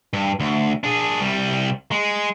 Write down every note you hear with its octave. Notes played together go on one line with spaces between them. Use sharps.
G2
D2
D4 G#4
C2 G3
G#3